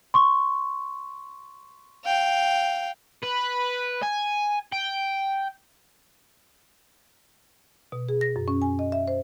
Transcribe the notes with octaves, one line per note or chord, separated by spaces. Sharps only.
C6 C#6
F5 G5
B4
G#5
G5
B2
G#4
A#6
F#2
C#4
G#5
D#5
E5
C5